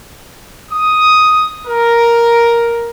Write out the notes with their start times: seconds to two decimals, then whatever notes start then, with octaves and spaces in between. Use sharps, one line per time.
0.71 D#6
1.67 A#4